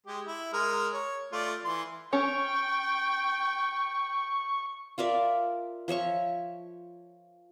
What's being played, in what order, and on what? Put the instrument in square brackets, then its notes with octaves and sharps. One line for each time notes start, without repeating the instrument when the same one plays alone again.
[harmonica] G#3 G4
E4
G#3 A#4 F6
C#5
A3 F4 D5
E3 C6
[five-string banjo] C#4 C#5 [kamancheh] G5 [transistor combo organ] C#6
[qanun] F4 A#4 D5 E5
F3 C#5 E5 C#6